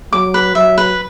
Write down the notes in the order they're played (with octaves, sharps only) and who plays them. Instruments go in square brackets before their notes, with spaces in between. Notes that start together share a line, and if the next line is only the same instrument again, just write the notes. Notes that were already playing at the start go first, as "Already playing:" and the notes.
[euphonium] F#3 [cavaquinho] D6
[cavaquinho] B4
[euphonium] F#3 [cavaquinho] E5
[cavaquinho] B4